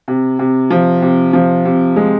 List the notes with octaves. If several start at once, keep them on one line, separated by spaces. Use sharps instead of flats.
C3
C3
F3
C3
F3
C3
G#3